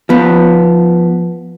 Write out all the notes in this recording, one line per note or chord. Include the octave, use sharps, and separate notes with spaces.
F3 B3